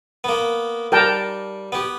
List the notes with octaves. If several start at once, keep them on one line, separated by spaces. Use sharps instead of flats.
A#3 B3
G3 A#4 G5 A5
B3 G4